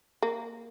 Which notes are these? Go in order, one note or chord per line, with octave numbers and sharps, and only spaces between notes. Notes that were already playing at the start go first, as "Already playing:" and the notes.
A#3